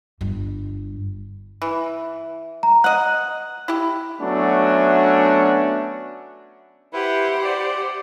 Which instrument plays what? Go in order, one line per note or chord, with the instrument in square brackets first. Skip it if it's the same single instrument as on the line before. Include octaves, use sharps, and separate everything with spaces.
[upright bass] G1 G2
[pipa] E3
[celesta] A#5
[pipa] D#5 F#5 [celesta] F#6
[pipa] E4 G4
[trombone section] F#3 A3 B3 C#4 D4 F#4
[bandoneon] E4 B4 [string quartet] G4 C5 F#5
[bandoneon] D5